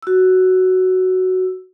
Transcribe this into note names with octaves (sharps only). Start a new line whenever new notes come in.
F#4 E6